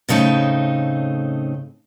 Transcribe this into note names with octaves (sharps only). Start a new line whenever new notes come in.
A2 C#3 A3 C4 D#4